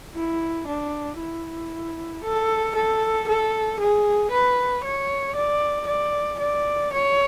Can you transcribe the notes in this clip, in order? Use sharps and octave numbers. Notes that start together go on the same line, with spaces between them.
E4
D4
E4
A4
A4
A4
G#4
B4
C#5
D5
D5
D5
C#5